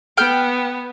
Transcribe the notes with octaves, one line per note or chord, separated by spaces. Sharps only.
B3 G5 F6